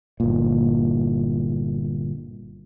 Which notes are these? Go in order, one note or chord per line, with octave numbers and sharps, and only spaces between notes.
G1 A#2